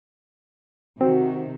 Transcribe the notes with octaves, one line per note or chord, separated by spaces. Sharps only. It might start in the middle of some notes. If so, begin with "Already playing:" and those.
C3 D#3 C4 F#4